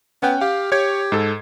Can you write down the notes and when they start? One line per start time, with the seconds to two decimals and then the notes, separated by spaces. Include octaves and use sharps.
0.23 B3 C#4 F#5 G5
0.41 G4 F5
0.72 G4 C#5 G#6
1.12 G#2 A4